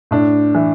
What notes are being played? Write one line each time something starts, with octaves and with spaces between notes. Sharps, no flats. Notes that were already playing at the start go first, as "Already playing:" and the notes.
A2 D4
E3